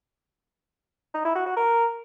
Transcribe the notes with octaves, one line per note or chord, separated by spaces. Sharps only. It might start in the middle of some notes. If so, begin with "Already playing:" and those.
D#4
E4
F#4
F#4
A#4